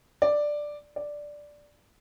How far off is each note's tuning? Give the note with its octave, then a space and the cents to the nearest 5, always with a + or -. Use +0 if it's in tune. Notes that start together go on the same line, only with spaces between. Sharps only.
D5 +5
D5 +0